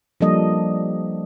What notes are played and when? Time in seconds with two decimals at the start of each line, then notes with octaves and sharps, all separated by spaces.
0.21 F3 G3 A#3 D4 A4 D#5